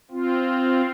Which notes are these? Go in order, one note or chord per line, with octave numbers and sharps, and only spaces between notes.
C4 F4